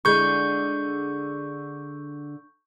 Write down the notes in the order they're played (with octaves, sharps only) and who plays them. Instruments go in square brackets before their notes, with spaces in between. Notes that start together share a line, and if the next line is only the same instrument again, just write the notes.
[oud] D3 G#3 E4 [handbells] C#6 G6